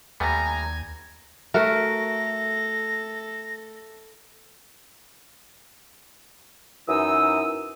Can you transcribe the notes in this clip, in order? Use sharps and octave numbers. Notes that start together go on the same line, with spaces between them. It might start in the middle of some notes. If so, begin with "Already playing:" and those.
D#2 G3 A3 B3 G#5 A#5
A3 F#4 A4 A#4 E5 A#6
F#2 E3 D#4 D#6 E6